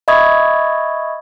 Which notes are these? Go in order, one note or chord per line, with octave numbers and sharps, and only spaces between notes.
D#5 E5 B5 C#6 D#6 G#6